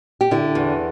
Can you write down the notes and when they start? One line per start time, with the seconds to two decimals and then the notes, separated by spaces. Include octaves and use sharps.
0.21 G4
0.31 D3 E4
0.55 E2